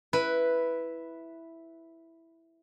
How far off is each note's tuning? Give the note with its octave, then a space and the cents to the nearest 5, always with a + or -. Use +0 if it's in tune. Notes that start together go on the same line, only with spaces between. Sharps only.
E4 +0 B4 +0